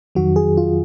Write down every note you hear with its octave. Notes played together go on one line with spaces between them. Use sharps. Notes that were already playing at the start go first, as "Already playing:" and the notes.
F2 D#3 F#3 F#4
G#4
F4